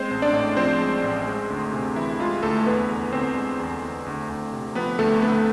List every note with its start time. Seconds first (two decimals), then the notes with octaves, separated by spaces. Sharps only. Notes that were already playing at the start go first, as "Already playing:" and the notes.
Already playing: G#3 C4 C5
0.11 A1
0.22 D4 D5
0.33 A2
0.57 F3 C4 C5
0.80 G#3
1.04 A1
1.27 G#3
1.50 D2
1.73 C3
1.96 E3 E4
2.20 G#3 F4
2.43 D2 A3 A4
2.66 E2 B3 B4
2.89 E2
3.12 D3 C4 C5
3.36 G#3
3.60 E2
3.83 E2
4.06 D2
4.29 D2
4.53 C3
4.75 F3 B3 B4
4.99 D2 A3 A4
5.22 D2 B3 B4